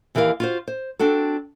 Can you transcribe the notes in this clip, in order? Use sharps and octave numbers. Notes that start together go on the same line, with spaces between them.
D#2 E3 G4 A#4 F5
F4 F#4 C5
C5
C4 D4 F#4 A4